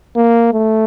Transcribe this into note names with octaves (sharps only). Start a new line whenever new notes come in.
A#3
A3